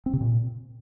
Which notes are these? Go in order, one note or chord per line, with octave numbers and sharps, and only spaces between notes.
C4
C3
A#2